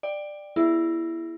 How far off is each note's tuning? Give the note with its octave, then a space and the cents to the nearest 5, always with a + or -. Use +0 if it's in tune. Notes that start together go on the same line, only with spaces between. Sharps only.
D5 +15 G5 +10
B3 -25 E4 +10 G#4 +0